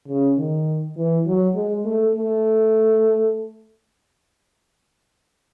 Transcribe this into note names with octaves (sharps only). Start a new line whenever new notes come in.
C#3
D#3
E3
F#3
G#3
A3
A3